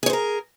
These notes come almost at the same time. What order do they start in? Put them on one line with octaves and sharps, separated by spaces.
G#4 C#5 C5 A#4